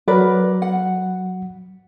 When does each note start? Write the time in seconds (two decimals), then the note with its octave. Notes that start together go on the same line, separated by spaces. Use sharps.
0.08 F#3 A#4 B4 D5
0.62 F#5